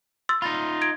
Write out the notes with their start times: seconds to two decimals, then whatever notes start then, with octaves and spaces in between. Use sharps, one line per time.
0.29 C6 E6 A6
0.42 D#4 F4 B5 A6
0.82 G#6 D7